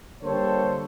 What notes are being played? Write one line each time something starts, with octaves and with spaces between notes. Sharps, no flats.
D3 G3 A#3 A4 C5 C#5